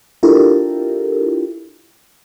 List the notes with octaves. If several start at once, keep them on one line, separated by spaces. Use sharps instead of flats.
D4 E4 F4 G4 A4 A#4